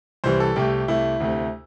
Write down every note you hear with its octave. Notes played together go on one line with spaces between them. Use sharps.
C2 C3 E3 G3 C5
A4
C2 C3 A3 G4
C2 C3 A3 E4
D2 C3 A3